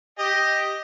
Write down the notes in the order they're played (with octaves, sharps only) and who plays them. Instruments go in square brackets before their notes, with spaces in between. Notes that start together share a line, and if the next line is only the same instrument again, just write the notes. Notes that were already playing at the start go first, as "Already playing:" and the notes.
[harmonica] G4 D#5